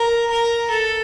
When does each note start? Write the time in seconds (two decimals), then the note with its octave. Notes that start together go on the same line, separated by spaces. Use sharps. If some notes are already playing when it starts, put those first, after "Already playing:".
Already playing: A#4
0.31 A#4
0.71 A4